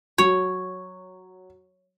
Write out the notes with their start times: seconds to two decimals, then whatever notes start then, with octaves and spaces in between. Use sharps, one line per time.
0.18 F#3 C#5